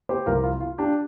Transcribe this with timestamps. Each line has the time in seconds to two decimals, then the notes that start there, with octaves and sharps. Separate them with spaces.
0.09 G4 C5
0.26 C2 C3 F3 F4 A#4
0.44 F4
0.61 F4
0.78 D4 G4